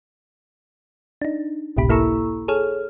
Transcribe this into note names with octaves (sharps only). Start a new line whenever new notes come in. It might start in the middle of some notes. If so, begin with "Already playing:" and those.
D4 D#4
G#1 C#2 A2 C3 G4 B5
A#3 E4 A4 A#5 C#6 E6
G#4 A4 C#5 F6